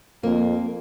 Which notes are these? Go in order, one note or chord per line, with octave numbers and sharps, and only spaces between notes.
F2 A#3